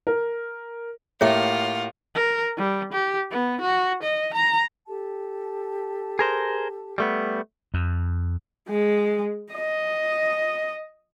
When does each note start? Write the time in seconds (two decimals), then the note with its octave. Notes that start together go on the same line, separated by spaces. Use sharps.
0.07 A#4
1.21 A2 A#3 F4 G4 C#5 E5 F#5 G5
2.15 A#4
2.57 G3
2.93 G4
3.31 B3
3.61 F#4
4.03 D#5
4.34 A#5
4.87 G4 A4 A5
6.19 G#4 A#4 C5
6.98 G3 A3 B3
7.74 F2
8.68 G#3
9.53 D#5